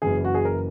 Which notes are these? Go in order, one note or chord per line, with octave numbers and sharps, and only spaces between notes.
F#1 F#2 E3 G#4
F#4
G#4
A#4